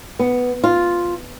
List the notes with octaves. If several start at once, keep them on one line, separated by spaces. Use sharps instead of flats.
B3
F4